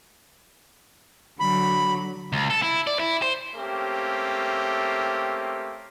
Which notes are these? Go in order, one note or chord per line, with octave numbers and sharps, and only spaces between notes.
D3 F#3 B5
C#2
A4
E4
D5
E4
C5
A3 A#3 C4 C#4 G4